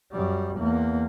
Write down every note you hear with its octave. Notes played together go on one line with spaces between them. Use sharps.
F#2 G3
E2 A#3